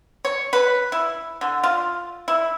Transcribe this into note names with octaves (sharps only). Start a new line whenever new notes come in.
C#5
B4
E4
D3
F4
E4